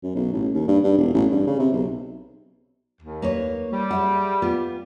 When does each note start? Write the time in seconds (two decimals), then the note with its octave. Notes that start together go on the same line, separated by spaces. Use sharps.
0.03 F#2
0.15 B1
0.33 A1
0.54 D#2
0.68 G2
0.84 G2
0.98 E1
1.14 A1
1.31 G2
1.47 C#3
1.59 C3
1.73 B1
3.01 D#2
3.22 A#3 B4 C#5
3.72 G3
3.91 G#4 E5 F#5
4.42 B3 F4